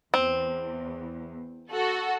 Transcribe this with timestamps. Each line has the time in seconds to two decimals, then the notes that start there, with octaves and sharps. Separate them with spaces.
0.14 E2 C4
1.72 F#4 A4